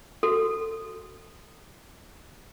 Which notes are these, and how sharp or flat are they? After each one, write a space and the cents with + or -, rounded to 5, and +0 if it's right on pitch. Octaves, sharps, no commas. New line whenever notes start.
F#4 +0 A4 +25